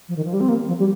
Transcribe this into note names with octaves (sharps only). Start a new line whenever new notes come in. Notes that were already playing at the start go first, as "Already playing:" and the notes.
F3
D#3
F3
G3
C4
A#3
F3
G3